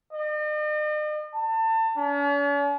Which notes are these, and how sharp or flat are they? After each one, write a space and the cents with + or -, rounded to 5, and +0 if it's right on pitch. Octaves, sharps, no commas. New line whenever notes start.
D#5 -45
A5 +30
C#4 +45